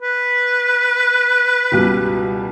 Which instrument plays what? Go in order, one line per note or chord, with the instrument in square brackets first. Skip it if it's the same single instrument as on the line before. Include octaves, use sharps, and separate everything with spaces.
[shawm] B4
[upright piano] C#2 B2 G3